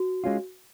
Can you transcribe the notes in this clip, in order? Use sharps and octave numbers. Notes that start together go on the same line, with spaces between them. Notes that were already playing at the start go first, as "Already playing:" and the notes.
Already playing: F#4
G#3 C#4 F4